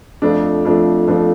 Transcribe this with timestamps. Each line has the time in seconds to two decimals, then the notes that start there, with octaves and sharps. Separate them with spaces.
0.22 F2 F3 A3 D4
0.65 F2 F3 A3 D4
1.08 F2 F3 A3 D4